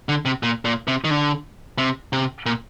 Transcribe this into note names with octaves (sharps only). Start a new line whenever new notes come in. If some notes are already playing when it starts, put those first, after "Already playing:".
D3
C3
A#2
A#2
C3
D#3
D3
C3
C3
A#2